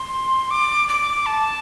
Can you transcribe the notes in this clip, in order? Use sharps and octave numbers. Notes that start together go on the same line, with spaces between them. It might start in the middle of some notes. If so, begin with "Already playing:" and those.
Already playing: C6
D6
D6
A5